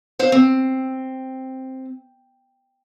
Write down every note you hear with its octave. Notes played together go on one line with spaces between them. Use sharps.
C5 F5
C4